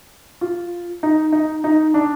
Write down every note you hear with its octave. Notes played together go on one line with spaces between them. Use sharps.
F4
D#4
D#4
D#4
D4